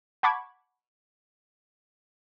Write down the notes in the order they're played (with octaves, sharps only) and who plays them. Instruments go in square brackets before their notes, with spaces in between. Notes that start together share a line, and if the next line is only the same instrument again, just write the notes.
[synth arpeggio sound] F#5 A5 B5 C#6 D6 G#6